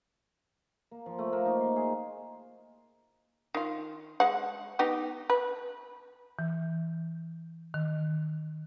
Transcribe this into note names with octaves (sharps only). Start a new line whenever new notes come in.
A#3
F3
A3
A#3
D#4
C6
G#4
D#3 F4
G#3 F#5
B3 D#4 G4
B4
E3
D#3